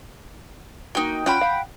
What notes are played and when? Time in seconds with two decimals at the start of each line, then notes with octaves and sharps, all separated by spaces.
0.95 A#3 D#4 F#4 G5
1.26 C#4 F4 F#5 G5 B5
1.41 F5